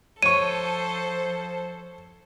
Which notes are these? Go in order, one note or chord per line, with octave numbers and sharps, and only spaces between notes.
F3 A4 C5 C#5 C#6 D#7